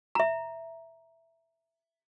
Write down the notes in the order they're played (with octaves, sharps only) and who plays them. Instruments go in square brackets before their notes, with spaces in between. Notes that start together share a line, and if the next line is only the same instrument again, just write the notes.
[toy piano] E5 A#5